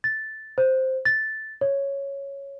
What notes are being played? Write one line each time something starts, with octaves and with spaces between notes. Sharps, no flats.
A6
C5
A6
C#5